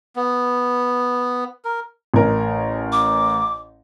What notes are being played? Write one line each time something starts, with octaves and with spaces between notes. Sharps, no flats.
B3
A#4
A1 A#4
D6